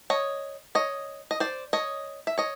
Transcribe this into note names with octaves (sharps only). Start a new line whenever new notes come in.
C#5 D#5
C#5 D#5
D#5
C5 D5
C#5 D#5
E5
C#5 D#5